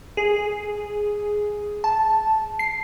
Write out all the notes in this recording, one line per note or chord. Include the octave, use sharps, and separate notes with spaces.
G#4
A5
C7